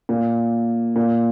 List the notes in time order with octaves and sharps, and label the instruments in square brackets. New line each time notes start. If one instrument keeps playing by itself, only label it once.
[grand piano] A#2
A#2